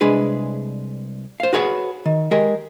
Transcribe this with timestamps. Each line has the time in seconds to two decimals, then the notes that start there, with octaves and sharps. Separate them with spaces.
0.01 C2 G#3 D4 G#4 B4
1.40 C5 F5
1.53 F#4 G#4 B4 C#5 D#5 F#5
2.05 D#3
2.31 G#3 G4 G#4 A#4